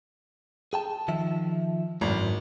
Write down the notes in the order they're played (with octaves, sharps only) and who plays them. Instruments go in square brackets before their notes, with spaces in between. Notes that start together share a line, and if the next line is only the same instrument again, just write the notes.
[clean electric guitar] G#4 G5 A5
D#3 F3 E5
[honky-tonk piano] G#1 [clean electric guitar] F#2 A2